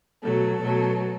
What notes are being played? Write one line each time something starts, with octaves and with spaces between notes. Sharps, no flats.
B2 F#3 A3 A4
B2 F#3 A3